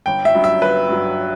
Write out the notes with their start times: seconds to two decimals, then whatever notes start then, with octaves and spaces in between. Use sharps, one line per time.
0.06 G1 G5
0.25 E5
0.35 G2 F#3
0.44 E5
0.61 G1 B4
0.89 G2 F#3